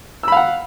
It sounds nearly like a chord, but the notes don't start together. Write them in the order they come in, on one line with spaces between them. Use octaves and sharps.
E6 B5 F5 F#5